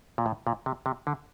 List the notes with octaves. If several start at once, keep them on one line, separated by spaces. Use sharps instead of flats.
A#2
A2
A#2
C3
C3
D3